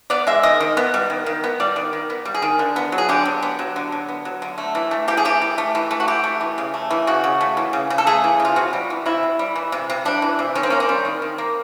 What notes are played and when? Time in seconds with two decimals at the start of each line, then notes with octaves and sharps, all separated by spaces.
0.10 B3 D5
0.27 G#3 E5
0.43 D#3 D#5
0.60 D#3
0.77 B3
0.94 G3
1.10 D#3
1.26 D#3
1.44 B3
1.60 G3 D5
1.76 D#3
1.93 D#3
2.10 B3
2.25 G3
2.34 G#4
2.42 D#3
2.59 D3
2.76 B3
2.92 F#3
2.98 G#4
3.09 D3 G4
3.25 D3
3.43 B3
3.59 F#3
3.76 D3
3.92 D3
4.09 B3
4.25 F#3
4.42 D3
4.58 A3
4.75 E3
4.91 A3
5.08 E3 G4
5.17 G#4
5.25 A3 G4
5.42 E3
5.58 A3
5.75 E3
5.91 A3
6.00 F#4
6.08 E3 G4
6.24 A3
6.41 E3
6.58 C#3
6.74 A3
6.91 E3
7.07 C#3 F#4
7.24 C#3
7.41 A3
7.57 E3
7.73 C#3
7.90 C#3
7.98 A4
8.07 A3 G#4
8.24 E3
8.40 C#3
8.45 F4
8.56 C3 F#4
8.73 G3
8.90 E3
9.06 C3 E4
9.23 C3
9.39 G3
9.55 E3
9.72 C3
9.90 C3
10.05 G3 D4
10.22 E3
10.39 C3
10.55 D#3 C#4
10.63 C4
10.70 A#3 C#4
10.80 C4
10.89 G3
11.05 D#3
11.22 D#3
11.38 A#3